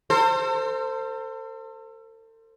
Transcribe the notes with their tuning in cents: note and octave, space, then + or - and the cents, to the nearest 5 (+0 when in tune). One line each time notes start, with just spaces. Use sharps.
A4 +40 C5 +0